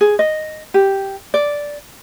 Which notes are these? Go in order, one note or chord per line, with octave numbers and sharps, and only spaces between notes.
G#4
D#5
G4
D5